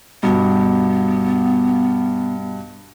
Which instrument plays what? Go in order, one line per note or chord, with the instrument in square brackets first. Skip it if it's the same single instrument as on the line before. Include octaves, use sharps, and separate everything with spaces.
[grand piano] G2 B2 [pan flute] B3